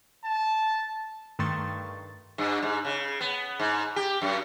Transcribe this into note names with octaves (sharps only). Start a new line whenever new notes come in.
A5
G2 D#3 A3 C6 C#6 A6
G2
G#2
C#3
B3
G#2
G4
F#2